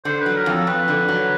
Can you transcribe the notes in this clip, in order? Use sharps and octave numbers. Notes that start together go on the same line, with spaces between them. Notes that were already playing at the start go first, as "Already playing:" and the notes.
D3 C5
B4
F#3
A#4
F2
A4
F2 B4
D3
F#3